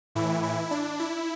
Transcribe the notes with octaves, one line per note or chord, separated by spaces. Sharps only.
A2 E3 E4
E4
D4
E4